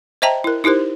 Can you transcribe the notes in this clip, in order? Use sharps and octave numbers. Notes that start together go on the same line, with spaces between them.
C5 D#5 E5 G5 A5 A#5
E4 A#4
D#4 E4 G4 A#4 C5